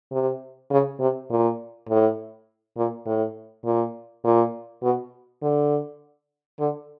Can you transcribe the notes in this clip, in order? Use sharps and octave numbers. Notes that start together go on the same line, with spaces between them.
C3
C#3
C3
A#2
A2
A#2
A2
A#2
A#2
B2
D3
D3